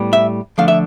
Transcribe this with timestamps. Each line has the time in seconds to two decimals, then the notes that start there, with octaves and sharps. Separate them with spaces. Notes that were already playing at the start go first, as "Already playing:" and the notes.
Already playing: A2 G3 B3
0.13 E5
0.58 D3 F3 A3 F5
0.68 E5